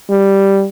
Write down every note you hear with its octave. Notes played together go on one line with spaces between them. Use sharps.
G3